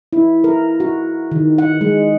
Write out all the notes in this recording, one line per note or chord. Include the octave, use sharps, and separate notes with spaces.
E4
A#4
F#4
D#3
F#5
G#3